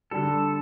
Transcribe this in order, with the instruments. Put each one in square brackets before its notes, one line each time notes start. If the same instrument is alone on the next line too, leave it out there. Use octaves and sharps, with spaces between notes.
[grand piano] D3 G3 D4 [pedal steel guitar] A4